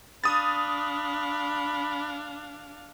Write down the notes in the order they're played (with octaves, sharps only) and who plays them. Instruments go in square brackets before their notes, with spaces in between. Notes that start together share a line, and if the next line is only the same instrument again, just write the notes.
[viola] D4 F5 [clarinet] B5 [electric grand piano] D#6 A6